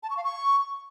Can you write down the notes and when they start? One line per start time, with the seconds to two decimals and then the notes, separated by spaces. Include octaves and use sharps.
0.03 A5
0.10 C#6
0.17 F5
0.24 C#6